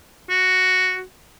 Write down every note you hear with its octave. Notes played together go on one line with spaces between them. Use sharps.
F#4